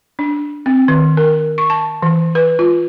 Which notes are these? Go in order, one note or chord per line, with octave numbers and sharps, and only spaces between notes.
D4
C4
D#3
A#4
C#6
A5
E3
B4
F4